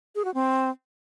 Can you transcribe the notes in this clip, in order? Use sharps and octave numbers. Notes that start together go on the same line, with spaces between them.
G#4
F#4
C4